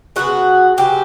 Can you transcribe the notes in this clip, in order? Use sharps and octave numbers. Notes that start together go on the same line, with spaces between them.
C#3 F#3 B3 F#4
C#3 F#3 B3 G4